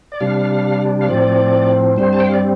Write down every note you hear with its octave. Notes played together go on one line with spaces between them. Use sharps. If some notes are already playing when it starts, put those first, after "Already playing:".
D5
C3 G3 D4 F5
F5
A2 F3 C4 D5
G2 G3 C4 C5
A5
G5
F5
D5